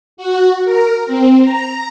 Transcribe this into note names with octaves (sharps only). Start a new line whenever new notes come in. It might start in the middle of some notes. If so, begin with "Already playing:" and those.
F#4
A#4
C4
A#5